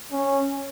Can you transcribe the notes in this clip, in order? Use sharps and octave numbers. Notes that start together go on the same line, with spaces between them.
C#4